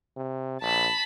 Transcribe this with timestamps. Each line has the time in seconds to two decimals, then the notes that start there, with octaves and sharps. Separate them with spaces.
0.16 C3
0.62 A#1 A5 B5